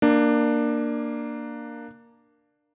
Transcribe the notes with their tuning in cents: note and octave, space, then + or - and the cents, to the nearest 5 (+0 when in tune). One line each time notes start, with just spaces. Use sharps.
A#3 +0 D4 +15